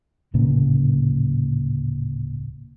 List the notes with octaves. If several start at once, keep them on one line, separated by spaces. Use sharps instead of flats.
D1 A#2 C#3 A#3